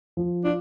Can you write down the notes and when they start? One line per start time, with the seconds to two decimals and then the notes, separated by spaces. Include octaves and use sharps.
0.17 F3
0.44 D4 F4